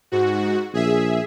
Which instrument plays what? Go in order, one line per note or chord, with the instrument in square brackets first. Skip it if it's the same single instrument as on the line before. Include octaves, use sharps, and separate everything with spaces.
[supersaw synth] G#2 F#4
[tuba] A#1 [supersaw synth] G#4 E5